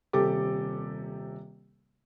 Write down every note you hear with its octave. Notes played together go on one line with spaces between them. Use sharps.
D#1 C3 G4 A4 D6